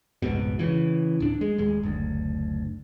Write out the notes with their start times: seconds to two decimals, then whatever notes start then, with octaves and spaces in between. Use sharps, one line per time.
0.22 F1 C#2 G#2 B2
0.59 C#3 E3
1.20 D1 D4
1.41 G#3
1.58 D#1 G#3
1.83 F#1 D2